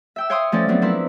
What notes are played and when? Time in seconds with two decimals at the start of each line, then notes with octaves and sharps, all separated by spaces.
0.16 E5 G5 E6
0.30 C#5 F5 G5 C6 C#6 D#6
0.52 F3 A3 C#4 D5
0.68 F3 F#3 B3 C4 D4
0.82 F3 C4 E4 A#4 B4